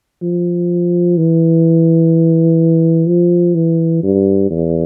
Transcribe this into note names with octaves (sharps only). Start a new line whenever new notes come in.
F3
E3
F3
E3
G2
E2